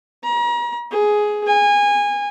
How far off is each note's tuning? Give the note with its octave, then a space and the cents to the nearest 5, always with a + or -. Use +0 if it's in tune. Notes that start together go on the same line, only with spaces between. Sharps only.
A#5 +40
G#4 +10
G#5 -25